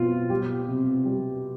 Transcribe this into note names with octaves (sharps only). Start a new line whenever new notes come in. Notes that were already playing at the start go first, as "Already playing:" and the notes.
Already playing: B2 C4 F4
G3 G4
C3
G3